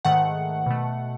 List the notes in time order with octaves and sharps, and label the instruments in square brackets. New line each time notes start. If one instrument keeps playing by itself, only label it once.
[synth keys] G#2 D#3 A3 F#5
B2 A3